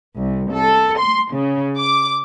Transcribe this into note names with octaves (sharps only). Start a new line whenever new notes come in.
C2
A4
C6
C#3
D6